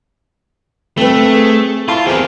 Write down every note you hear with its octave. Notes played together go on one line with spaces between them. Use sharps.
A3 C4 B4
G#4
E4 F4 A5 C6
B3 C4 G4 G#4 A#4